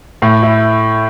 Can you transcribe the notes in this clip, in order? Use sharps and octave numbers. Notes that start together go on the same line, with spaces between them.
A2
E4